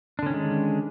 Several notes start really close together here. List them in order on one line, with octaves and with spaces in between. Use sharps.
D4 D3 C#4 D#3 G#3